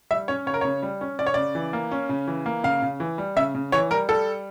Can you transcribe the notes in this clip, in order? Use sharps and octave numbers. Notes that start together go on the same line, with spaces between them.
G3 E5
C#4 C#5
C#3 C#5
A#4
C#3 C#5
G3
C#4
C#4 D5
C#5
C#3 D5
E3
A#3
C#4
C#3
E3
A#3
C#3 F5
C#3
E3
G3
C#3 E5
C#3
E3 C#5
G3 A#4
G3 A4